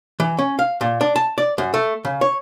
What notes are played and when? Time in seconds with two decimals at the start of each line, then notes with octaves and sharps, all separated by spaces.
0.20 E3
0.39 C#4
0.59 F5
0.81 A#2
1.01 D4
1.16 A5
1.38 D5
1.58 F#2
1.74 A3
2.05 C#3
2.21 C#5